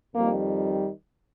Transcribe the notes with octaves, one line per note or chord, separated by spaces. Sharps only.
F2 D#3 G3 A#3